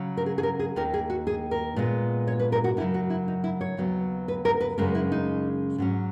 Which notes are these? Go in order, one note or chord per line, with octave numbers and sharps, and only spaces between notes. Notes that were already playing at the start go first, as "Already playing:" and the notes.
Already playing: C#3 F#3 C#4
A#4
G#4
G#4
A#4
G#4
D#2 D#3 A#3 A#4
G#4
F#4
G#4
A#4
A#2 G#3 B3
C#5
B4
A#4
F#4
F#2 C#3 F#3 E4
F#4
E4
D#4
E4
C#5
D#2 C#3 F#3 B3
B4
A#4
B4
F#2 C#3 G#3 C#4 A#4
E4
D#4
G#2 F#3 C#4